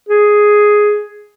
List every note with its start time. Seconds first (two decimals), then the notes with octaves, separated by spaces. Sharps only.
0.09 G#4